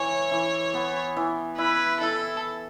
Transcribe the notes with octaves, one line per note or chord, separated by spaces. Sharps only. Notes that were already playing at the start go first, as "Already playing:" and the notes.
Already playing: E3 E4 C#5
E3
B3
E3
E4 B4
E4 A4